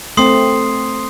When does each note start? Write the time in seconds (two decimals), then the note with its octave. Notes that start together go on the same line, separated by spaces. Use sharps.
0.17 A3 C4 C6 D#6 C7